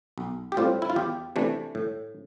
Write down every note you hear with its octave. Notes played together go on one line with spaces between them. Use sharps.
B1
G4
A2 G3 C4 F4
E4
F4
E2 G4
C3 E3 A3 D4
A2